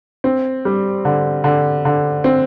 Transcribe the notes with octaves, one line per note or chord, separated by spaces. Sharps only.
C4
G3
D3
D3
D3
C4